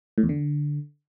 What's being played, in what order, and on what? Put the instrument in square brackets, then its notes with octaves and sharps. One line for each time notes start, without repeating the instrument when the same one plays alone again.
[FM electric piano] A2
E2
D3